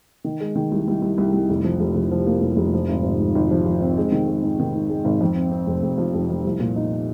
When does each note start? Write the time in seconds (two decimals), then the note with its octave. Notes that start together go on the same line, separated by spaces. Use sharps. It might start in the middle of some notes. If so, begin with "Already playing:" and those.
0.24 D#3
0.40 G#3
0.55 D#3
0.72 C2
0.88 C2
1.02 C2
1.18 C2
1.33 C2
1.50 F1
1.64 F3
1.80 F1
1.96 F1
2.11 F3
2.27 A#3
2.42 F1
2.57 F1
2.74 F3
2.89 G#1
3.04 G#1
3.20 G#2
3.35 G#1
3.51 F3
3.66 F3
3.81 C4
3.98 G#3
4.12 D#3
4.27 G#3
4.43 G#2
4.60 D#3
4.74 G#2
4.89 G#3
5.05 G#1
5.21 F2
5.36 C4
5.51 C4
5.67 F1
5.83 F1
5.98 F3
6.14 F1
6.30 F3
6.44 C2
6.60 A#2
6.76 D#4